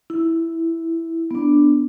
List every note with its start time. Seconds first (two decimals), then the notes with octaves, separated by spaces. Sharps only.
0.10 E4
1.31 B3 D4